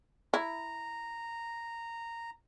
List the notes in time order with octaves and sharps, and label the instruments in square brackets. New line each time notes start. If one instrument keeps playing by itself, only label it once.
[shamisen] E4 [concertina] A#5